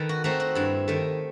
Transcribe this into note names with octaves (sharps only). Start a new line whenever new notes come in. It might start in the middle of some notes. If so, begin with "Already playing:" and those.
Already playing: D#3 A4 B4
F#4
A3 C4 D#4 F#4
F#4
G2 E4
D#3 A3